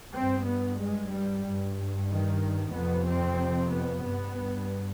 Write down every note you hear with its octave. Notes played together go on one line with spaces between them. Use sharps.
G2 C4
B3
G#3
G3
G2
D#3
F2 C3 B3
C4
B3
G2